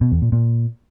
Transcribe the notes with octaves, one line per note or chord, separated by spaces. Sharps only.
B2
E2
A#2
A#2